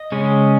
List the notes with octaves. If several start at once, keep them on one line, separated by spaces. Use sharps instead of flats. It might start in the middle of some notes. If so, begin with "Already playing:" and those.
Already playing: D#5
C#3 G#3 C#4